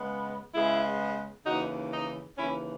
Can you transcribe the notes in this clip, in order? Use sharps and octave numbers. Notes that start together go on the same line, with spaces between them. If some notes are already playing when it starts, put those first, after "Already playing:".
Already playing: C#3 G#3 B3
C#3 G#3 B3 E4 G#4
D#2 C#3 E3 D#4 F#4
D#4
D#2 C#3 E3 C#4 E4